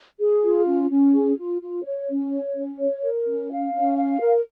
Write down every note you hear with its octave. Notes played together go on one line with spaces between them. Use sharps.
G#4
F4
C#4
C#4
G#4
F4
F4
C#5
C#4
C#5
C#4
C#5
A#4
C#4
F5
C#4
F5
A#4